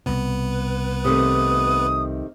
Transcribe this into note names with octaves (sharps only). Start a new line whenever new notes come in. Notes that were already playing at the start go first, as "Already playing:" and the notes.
C2 B2 B3 B4
C3 D#3 A3 D#6